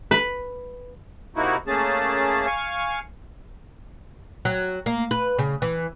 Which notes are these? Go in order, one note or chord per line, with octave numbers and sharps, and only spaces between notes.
B4
C3 A#3 D#4 E4 F#4
A3 A#3 C#4 G#4 A5
F5 G#5 C#6
F#3
A#3
B4
C#3
E3